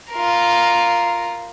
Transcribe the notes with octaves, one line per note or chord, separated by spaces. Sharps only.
F4 A#4